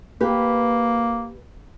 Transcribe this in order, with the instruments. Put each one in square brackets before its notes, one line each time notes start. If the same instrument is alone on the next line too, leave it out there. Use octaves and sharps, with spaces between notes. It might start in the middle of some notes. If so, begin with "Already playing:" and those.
[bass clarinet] A#3 [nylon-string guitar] G4 B4